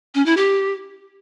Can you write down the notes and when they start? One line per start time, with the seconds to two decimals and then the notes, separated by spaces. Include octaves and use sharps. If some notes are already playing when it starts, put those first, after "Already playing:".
0.15 C#4
0.26 E4
0.37 G4